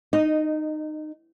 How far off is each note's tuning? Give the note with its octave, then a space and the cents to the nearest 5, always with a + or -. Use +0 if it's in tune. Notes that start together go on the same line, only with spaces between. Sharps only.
D#4 -20 D#5 +0